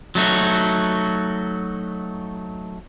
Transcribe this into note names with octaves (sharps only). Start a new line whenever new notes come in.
F#3 A3 D#4 F#4